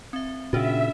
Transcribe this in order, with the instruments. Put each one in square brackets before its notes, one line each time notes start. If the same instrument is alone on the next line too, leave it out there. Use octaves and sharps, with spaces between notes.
[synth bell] C4 E5
[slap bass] A#2 C#3 [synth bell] C#4 D4 F#4 [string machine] E5